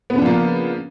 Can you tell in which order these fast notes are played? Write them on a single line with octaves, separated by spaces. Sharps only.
B3 C#3 D4 F3 A#3